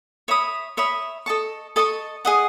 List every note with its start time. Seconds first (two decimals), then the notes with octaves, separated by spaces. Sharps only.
0.28 C#5 E5 B5 D#6
0.77 C#5 E5 B5 D#6
1.26 A4 D#5 A5 C#6
1.76 A4 D#5 A5 C#6
2.25 G#4 D#5 F#5